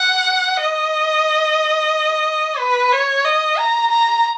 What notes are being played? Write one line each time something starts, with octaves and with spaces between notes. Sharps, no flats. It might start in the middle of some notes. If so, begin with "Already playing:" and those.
Already playing: F#5
D#5
B4
C#5
D#5
A#5
A#5